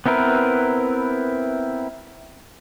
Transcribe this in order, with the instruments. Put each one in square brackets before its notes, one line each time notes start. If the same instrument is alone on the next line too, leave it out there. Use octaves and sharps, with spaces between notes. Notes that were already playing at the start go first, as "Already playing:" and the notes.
[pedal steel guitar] B3 C4 E4 A#4 B4